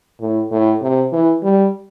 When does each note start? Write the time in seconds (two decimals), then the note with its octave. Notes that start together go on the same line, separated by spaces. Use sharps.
0.21 A2
0.51 A2
0.82 C3
1.13 E3
1.43 G3